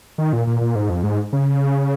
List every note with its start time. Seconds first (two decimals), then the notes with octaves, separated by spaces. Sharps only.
0.18 D#3
0.33 A#2
0.47 A#2
0.61 A#2
0.75 G#2
0.90 F2
1.03 G#2
1.33 C#3